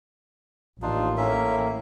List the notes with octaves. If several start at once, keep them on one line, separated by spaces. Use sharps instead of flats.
A1 D#2 D4 D#4 F4
A2 A#3 C#4 E5